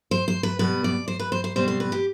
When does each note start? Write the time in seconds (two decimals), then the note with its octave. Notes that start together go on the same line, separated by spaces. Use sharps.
0.11 C5
0.28 C5
0.43 B4
0.59 B2 G3 B3 B4
0.84 D5
1.08 C5
1.20 B4
1.32 C5
1.44 C5
1.56 B2 G3 C4 C5
1.68 C5
1.80 B4
1.92 G4